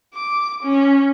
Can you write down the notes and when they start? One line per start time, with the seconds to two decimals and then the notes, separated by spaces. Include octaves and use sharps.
0.14 D6
0.63 C#4